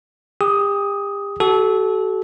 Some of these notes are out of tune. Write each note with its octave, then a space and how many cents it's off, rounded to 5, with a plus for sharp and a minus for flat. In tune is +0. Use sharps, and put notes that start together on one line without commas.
G4 +40 D#6 +15
F#4 +40 A4 -25